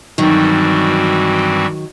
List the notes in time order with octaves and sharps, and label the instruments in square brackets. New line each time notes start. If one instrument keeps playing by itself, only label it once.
[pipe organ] G2 E3 G3 C4 F#4 [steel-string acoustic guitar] D#3 F#3